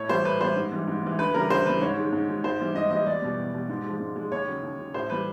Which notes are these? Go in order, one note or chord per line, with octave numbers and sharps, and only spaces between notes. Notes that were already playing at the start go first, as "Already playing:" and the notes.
Already playing: A2 C#5
E3 G3 C5
A2 B4
E3 G3 C5
G#2
E3 G3
G#2
E3 G3
D2 B4
C#3 E3 G3 A#4
D2 C5
C#3 E3 G3 B4
G#2 C#5
D#3 G#3
G#2
D#3 G#3
G#2 C5
E3 G3
G#2 D#5
E3 G3 D#5
E2 D5
B2 G3
E2
B2 G3
G#2
F3 G#3
G#2
F3 G#3
D#2 C#5
C#3 F#3
D#2
C#3 F#3
A2 C5
E3 G3 B4